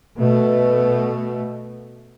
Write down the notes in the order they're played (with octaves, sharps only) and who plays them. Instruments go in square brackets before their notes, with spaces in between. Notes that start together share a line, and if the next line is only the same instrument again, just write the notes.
[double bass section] B2 A3